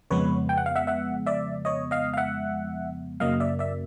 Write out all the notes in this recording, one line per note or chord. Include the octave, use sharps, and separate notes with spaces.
F2 C#3 F3 G#3 B3 B4 C#5
G5
F#5
F5
E5 F#5
E5 F#5
D5 E5
C#5 D#5
D#5 F5
F5
E5 F#5
F#2 C#3 F#3 A#3 D#5 F5
D5 E5
D5 E5